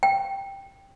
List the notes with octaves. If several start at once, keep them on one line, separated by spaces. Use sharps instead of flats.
G5